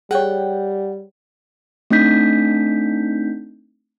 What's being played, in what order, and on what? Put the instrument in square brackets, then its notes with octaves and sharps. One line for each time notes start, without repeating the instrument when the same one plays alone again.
[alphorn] G3 [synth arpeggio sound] G#4 C#5 [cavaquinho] F#5 G5
[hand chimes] A3 C4 D4 D#4 G6 B6